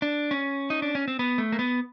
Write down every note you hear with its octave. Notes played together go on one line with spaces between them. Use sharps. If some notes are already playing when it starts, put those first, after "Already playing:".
D4
C#4
D#4
D4
C#4
C4
B3
A3
A#3
B3